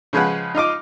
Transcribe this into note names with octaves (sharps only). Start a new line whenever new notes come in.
C#3 F3 G#3 G#4 B4 F#5
D#4 F4 D#5 D6